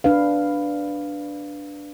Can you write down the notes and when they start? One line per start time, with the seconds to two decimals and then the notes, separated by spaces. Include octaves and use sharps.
0.04 D4 B4 F5